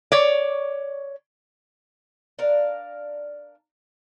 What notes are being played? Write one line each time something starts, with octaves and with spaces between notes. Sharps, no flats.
C#5 D5
D4 A#4 F5